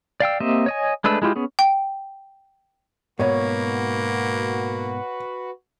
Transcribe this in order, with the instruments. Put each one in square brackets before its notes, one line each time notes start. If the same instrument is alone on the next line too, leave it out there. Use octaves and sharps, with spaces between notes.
[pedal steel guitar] D5 F5 G5 E6
A#3 C4 G4 D#5 E5
C#5 D#5 G#5
G#3 A3 D4 B4 E6
G#3 E4 F4 G4
B3 C#4 G#4
[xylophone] G5
[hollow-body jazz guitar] G#2 B2 [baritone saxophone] A#3 [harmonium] F#4 B4 [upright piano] C#5